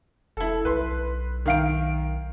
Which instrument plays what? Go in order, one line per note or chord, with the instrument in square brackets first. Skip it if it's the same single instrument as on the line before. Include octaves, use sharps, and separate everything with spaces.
[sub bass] F1 [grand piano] E4 A4
[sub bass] B1 [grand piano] B4 C6
[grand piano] D#3 F5 D7